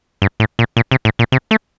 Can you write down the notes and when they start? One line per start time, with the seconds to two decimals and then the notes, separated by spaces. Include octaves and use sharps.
0.22 G2
0.40 A2
0.59 A#2
0.77 A#2
0.91 C3
1.05 A2
1.19 A#2
1.32 C3
1.51 A3